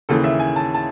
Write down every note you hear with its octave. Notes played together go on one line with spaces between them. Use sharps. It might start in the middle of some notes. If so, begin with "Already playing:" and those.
D#2 C#3 E3 A4
E5
G#5
A5
A5